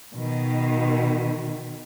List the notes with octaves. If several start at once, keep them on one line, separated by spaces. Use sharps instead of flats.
B2 D#3